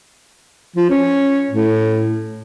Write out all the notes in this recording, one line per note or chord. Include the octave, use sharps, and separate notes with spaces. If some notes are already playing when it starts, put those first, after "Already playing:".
F3
C#4
A2